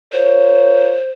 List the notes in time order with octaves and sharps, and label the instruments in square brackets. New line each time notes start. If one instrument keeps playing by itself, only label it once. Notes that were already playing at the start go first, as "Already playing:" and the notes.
[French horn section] F4 A#4 C#5 [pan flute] C5